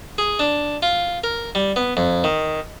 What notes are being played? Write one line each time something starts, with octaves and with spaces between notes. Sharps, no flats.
G#4
D4
F4
A#4
G3
B3
F2
D#3